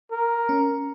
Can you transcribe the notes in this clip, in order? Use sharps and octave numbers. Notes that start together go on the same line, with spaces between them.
A#4
C#4